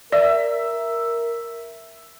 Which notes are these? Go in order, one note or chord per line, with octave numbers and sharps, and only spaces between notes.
A#4 D5 E5